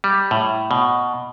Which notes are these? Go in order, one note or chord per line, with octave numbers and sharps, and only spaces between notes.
G3
A2
B2